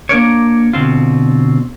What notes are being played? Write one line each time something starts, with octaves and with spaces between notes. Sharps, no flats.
A#3 D4 A#4 C#5
B2 D3 C4 F4